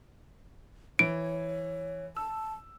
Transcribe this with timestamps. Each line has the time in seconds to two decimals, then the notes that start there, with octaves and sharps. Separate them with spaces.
0.99 E3 C#5 D7
2.16 A5 E6